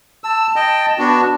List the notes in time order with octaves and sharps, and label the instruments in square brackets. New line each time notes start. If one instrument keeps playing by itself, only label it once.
[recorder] A5 [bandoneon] E6
[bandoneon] D#5 G5
B3 D4 F#4